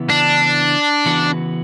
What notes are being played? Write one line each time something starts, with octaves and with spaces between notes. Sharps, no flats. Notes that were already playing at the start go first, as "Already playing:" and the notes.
Already playing: C#3 E3 B3 E4
D4
C#3 E3 B3 F#4 B4